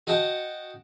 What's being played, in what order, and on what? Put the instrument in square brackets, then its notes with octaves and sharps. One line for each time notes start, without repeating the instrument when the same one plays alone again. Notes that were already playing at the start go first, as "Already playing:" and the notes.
[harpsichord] F#4 D#5 F#5 G5 A5